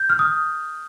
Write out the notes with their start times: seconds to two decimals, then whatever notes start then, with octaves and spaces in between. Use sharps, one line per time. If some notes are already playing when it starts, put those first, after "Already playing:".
Already playing: G6
0.10 F6
0.19 D#6